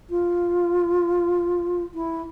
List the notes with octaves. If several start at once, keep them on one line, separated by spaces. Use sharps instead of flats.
F4
E4